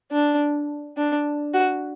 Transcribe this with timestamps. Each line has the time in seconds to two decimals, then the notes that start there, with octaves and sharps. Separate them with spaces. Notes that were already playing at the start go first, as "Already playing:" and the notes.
0.11 D4
0.97 D4
1.54 F#4